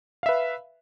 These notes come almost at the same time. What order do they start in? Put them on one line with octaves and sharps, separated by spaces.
F5 E5 B4